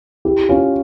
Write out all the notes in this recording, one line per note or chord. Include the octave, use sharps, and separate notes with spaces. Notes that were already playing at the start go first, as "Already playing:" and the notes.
E4 G4
C#4 F4